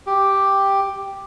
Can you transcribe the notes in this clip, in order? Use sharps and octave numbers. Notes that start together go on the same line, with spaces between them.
G4